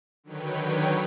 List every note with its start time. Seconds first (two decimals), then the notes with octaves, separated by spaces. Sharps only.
0.24 D3 D#3 F#3 B4 C#5 G5